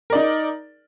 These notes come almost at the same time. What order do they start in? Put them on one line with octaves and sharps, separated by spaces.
A#4 D5 D#4